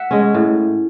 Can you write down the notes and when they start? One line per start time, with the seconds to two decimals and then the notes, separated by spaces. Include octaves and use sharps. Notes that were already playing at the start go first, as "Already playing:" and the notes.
Already playing: E5 F#5
0.11 G#3 C#4
0.34 A2